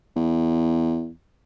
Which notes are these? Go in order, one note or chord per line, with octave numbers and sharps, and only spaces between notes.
E2